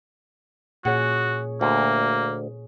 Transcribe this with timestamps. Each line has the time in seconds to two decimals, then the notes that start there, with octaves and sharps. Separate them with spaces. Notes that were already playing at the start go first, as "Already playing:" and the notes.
0.85 A#2 F#4 G#4 C#5 F#5
1.61 D2 A#3